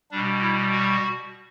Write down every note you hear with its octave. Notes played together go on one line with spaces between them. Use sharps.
B2 G3 D4
E4
F#4